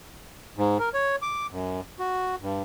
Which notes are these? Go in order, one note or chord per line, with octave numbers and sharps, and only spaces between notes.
G#2
A#4
C#5
D6
F#2
F#4
G2